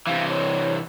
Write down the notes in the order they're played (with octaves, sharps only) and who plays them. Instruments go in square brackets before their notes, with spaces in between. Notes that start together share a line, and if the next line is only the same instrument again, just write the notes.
[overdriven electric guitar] C3 E3 [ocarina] F5
[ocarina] C#5